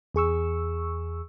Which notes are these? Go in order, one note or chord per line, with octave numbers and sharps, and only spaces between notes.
E2 G#4 C#6 E6